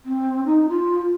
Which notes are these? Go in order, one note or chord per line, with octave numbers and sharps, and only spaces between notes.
C4
D#4
F4